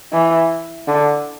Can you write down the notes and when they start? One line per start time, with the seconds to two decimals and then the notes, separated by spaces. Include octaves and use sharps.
0.12 E3
0.87 D3